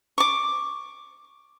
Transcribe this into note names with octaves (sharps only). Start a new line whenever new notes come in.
C#6 D6